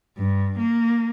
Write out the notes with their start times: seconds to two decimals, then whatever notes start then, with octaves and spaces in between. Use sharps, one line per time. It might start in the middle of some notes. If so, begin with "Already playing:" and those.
0.17 G2
0.59 A#3